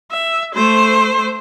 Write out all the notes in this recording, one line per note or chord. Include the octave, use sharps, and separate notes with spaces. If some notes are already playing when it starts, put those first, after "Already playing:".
E5
A3 C5